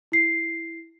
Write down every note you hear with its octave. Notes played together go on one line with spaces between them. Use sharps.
E4 C7